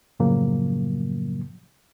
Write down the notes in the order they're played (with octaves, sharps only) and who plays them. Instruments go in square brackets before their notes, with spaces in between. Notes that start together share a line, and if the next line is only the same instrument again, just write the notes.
[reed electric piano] F#2 A2 C#3 F3 F#3 A#3